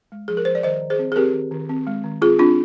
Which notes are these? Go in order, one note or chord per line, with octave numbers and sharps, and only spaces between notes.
G#3
F3 G#4
A#4
F3 C5
D5
D#3 C5 D#5
D#3
G#4 C5
C4
G#4
C4 G4 A#4
D#3
D#3
C4
G#3
D#3
C4 F4 G#4
C4 D4 F4